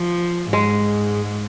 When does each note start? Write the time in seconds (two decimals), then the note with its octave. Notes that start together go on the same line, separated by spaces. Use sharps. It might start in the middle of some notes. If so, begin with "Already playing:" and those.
Already playing: F3
0.52 G#2 G#3